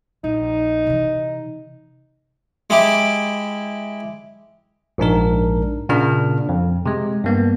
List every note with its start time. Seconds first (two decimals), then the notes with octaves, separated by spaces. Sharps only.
0.24 A#1 D#4
0.87 C3 E3
2.70 G#3 E4 G4
4.98 A#1 G#2 D4 A#4
5.89 A#2 C#3 A#3 D4 F6
6.49 F2
6.86 C3 G#3
7.24 G2 A#3 B3